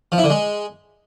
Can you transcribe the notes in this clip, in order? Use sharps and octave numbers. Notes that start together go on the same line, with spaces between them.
F3
E4
D3
G#3